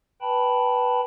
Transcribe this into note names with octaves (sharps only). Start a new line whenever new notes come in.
B4 G5 A5 B5